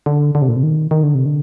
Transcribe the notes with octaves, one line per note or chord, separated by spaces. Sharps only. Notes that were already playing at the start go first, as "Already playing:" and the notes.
D3
D3
C3
A#2
C3
D#3
D#3
D3
C3
D3